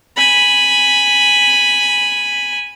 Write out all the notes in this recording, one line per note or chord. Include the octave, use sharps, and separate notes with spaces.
G#5 B5